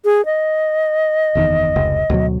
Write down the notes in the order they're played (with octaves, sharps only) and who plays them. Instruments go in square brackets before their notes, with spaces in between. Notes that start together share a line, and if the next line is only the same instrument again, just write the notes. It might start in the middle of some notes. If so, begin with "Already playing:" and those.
[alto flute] G#4
D#5
[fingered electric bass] F#1 E2 D#3
F1 C#2
D2 B2 F#3